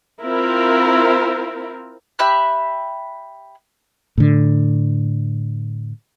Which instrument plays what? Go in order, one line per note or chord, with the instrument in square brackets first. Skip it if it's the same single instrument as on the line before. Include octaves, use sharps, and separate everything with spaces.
[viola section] C4 E4 F4 A#4
[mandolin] G4 E5 B5 F#6
[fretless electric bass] A2 D3